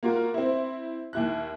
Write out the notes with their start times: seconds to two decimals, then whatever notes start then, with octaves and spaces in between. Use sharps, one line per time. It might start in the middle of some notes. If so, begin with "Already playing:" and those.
0.03 A#3 F4 F#4 A#4
0.34 C4 E4
1.13 D#2 E4 F#6